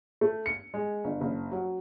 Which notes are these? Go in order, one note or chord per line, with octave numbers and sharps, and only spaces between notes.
A3
C#7
G#3
G1
F#1
F#3